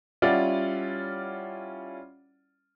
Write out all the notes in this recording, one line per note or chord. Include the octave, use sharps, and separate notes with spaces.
G3 C#4 E4 F4 D5 F#5